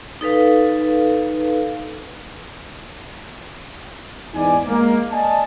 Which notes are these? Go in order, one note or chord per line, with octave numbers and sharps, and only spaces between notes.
D#4 A4 B4 F5
E2 G#2 B3 D#4 D5 G#5
G#3 A#3
D5 D#5 G#5 A5